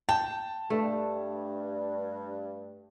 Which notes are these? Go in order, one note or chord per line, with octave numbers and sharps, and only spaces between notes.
G5 A5
G2 A3